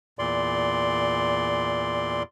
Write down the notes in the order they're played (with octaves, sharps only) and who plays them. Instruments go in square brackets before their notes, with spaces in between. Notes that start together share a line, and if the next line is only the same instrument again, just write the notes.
[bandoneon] E2 A#2 D5 C6